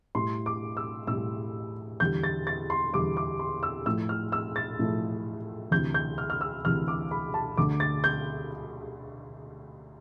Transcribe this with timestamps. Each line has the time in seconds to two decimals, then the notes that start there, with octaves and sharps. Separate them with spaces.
0.15 A2 G3 C6
0.46 D6
0.77 E6
1.07 A2 G3 E6
2.00 E2 D3 G3 G6
2.24 A6
2.47 A6
2.70 C6
2.93 E2 D3 G3 D6
3.17 D6
3.39 C6
3.63 E6
3.86 A2 F3 A3 E6
4.09 F6
4.32 E6
4.56 A6
4.79 A2 F3 A3
5.71 D2 C3 E3 G6
5.94 G6
6.18 F6
6.30 F6
6.41 E6
6.64 D2 C3 E3 F6
6.88 D6
7.11 B5
7.34 A5
7.57 D2 D3 A3 D6
7.80 A6
8.04 G6